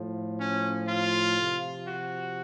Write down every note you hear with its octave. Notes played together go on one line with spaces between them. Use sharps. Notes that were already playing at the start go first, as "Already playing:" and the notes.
Already playing: A2 F3
C#4
F4
C3 F3
F#4